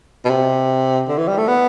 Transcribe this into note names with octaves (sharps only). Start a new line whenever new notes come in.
B2
C3
D3
E3
G3
A3
B3